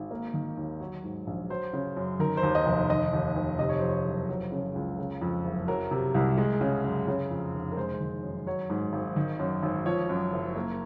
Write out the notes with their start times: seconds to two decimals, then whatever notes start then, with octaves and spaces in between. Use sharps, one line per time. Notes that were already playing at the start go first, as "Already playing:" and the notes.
Already playing: G#1
0.11 A#3
0.34 D#3
0.57 D#2
0.80 F#3 C#5
1.04 G#2
1.27 A#1
1.50 F#3 C5
1.73 C#3
1.96 F#2
2.19 D#3 A#4
2.37 C5
2.43 D#2
2.55 D#5
2.66 F1
2.89 D#3 D#5
3.13 D#2
3.36 F1
3.59 C3 D#5
3.69 C#5
3.79 F2 C5
3.89 C#5
4.05 F#1
4.28 F#3 C5
4.52 C#3
4.75 C#2
4.98 C#3
5.21 F2
5.45 F#1
5.68 F#3 A#4
5.91 C3
6.14 C2
6.38 G#3
6.61 C#3
6.84 F#2
7.08 C#3
7.30 F2
7.54 F1
7.72 A#4
7.77 G#3 C5
8.00 D#3
8.23 F#2
8.47 F#3 C#5
8.70 G#2
8.93 G#1
9.16 D#3
9.39 F#2
9.63 G#1
9.86 F3 C#5
10.09 F#2
10.32 F#1
10.55 A#3